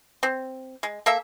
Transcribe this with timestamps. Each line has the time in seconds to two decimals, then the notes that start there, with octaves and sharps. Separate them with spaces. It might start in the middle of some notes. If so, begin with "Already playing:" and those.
0.23 C4
0.83 G#3
1.06 A#3 A4 E5